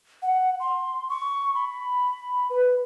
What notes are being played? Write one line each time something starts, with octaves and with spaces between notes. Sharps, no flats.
F#5
C6
C#6
B5
B4